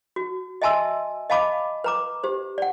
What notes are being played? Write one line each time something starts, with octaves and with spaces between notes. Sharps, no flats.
F#4
D#5 E5 G#5 A5 C6 E6
D#5 F5 A5 B5 D6
B4 A#5 D6
G4 C5
D5 F#5